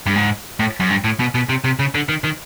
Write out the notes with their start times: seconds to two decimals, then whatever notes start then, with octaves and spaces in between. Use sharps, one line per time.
0.06 G2
0.16 G#2
0.60 A2
0.80 F#2
0.90 G2
1.04 A2
1.20 B2
1.35 B2
1.49 C3
1.64 C3
1.79 C#3
1.95 D3
2.09 D#3
2.24 D#3